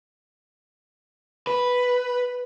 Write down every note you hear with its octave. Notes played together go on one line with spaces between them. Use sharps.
B4